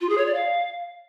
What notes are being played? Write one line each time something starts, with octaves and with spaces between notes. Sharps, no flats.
F4
G#4
C#5
D5
F5